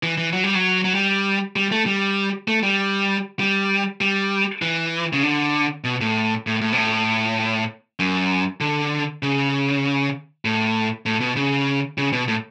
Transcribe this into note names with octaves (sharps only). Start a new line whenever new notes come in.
E3
E3
F#3
G3
F#3
F#3
G3
G3
A3
G3
A3
G3
G3
G3
E3
C#3
D3
B2
A2
A2
A2
B2
A2
F#2
D3
C#3
A2
A2
B2
C#3
C#3
B2
A2